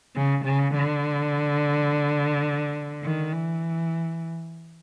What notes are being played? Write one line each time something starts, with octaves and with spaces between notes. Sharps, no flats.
C#3
C#3
D3
D#3
E3